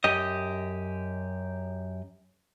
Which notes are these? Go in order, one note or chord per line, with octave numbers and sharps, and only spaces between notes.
F#2 G4 D#5